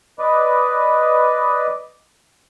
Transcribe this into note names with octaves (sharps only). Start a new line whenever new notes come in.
B4 D5 D#5